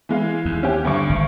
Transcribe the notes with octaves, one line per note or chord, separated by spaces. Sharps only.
E3 G#3 F5
D#2
C#4 G4
D2 G2 C#6
G#1